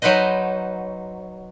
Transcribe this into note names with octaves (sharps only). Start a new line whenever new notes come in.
F#3 D#4 B4 C5 D#5